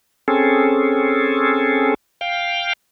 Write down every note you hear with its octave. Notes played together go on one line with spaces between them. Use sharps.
C4 C#4 G#4 A4
F5 G5